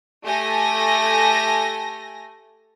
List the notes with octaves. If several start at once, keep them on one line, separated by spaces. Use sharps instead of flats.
A3 G4 A4 G#5 A#6